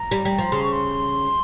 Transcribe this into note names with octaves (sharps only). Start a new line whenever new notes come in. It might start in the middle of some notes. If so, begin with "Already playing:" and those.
Already playing: A#5
G3
G3
F3
C#3 C6
C#6
C6